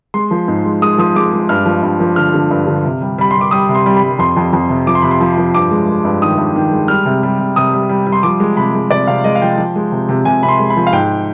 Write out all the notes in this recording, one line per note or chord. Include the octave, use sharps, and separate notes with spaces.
G#3 C6
F3
G#2
G#3
G#3 D#6
F3 D#6
G#3 D6
G#3
G2 F6
F3
G2
F3
D3 F6
D3
G2
D3
C3
G3
G3 B5
G3 C6
D6
G3 D#6
C3
C6
G3
B5
G3
F2 C6
F2
F2
C3
F3 D6
C6
C3 B5
C6
F3
F3
G2 D6
G#3
G#3
G2
D#3 D#6
G2
D#3
G#3
G3 F6
C3
G3
C3
C3 D#6
G3
G3
G3
C6
F3 D6
G#3
C3 B5
G#3
C3 D5
C3 F5
G#3 D#5
F5
F3 G5
F3
G#3
C3
C3
C3 G#5
C3 B5
C6
G#3
B5
F3
F5
G#2 G5